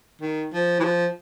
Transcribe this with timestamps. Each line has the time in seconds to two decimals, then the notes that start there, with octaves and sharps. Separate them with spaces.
0.21 D#3
0.53 F3
0.80 E3
0.84 F3